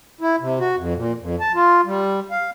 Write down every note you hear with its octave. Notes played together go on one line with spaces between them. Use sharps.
E4
C3
F#4
F2
A#2
F2
A5
F4
G3
F5